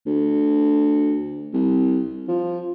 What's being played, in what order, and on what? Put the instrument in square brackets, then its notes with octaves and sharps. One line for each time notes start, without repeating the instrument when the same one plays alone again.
[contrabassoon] D2
C2
F3